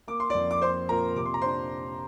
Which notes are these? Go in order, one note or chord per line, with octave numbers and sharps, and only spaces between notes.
A#3 D6
C6
D5 D6
F2
D6
C4 C5 C6
A#2 A#4 A#5
C3 D6
C6
A#5
D4 C5 C6